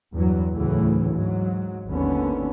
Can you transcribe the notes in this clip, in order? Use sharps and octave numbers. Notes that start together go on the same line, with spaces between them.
E2 G2 F#3
D2 A2 C#3 E3 F#3
G#2 F#3
G#1 D#2 D3 B3 C#4